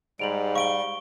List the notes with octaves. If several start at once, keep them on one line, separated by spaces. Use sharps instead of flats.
G#2 G3 D7 F7 F#7
F5 C#6 D7 G7